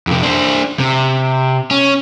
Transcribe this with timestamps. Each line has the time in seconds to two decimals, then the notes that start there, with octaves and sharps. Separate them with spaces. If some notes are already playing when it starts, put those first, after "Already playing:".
0.07 F2 C3
0.23 D4 C5
0.79 C3
1.71 C#4